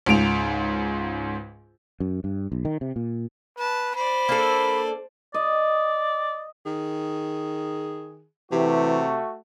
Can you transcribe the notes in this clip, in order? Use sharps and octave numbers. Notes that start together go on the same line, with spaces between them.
C#2 G#2 D7 F7
F#2
G2
B1
D#3
C3
A#2
B4 A5
C5 D5 B5
A#3 D4 A4
D5 D#5
D#3 G#4
C3 E3 A3 F#4 G4